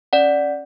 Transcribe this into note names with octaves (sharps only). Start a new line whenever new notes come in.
C#4 D5 F#5